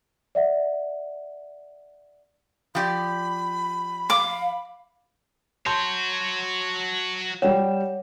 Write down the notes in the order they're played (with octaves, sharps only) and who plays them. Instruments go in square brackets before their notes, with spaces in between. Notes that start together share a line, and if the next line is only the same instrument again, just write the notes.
[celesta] D5 E5 F#5
[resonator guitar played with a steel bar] F3 G4 D5 [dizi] B5
[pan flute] F5 [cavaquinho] D6
[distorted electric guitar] F#4 C#5 [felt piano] A5 C6 G6
[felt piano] G3 G5 E7 [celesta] C#5 F#5